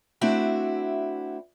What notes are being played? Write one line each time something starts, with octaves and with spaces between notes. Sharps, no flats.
A3 C4 D4 E4 F#4